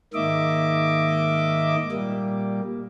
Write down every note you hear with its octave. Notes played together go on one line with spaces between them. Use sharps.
G#2 D#3 A#3 D#5 E5 D6
A#2 G3 A#3